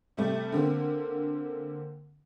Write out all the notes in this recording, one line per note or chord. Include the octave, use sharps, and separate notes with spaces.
C3 G3 A3
D3 A#3 C4